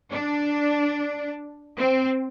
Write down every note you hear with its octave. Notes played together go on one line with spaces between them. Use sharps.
D4
C4